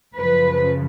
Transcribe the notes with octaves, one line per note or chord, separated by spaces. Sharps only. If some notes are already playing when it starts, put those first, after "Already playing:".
F#2 C#3 F3 B4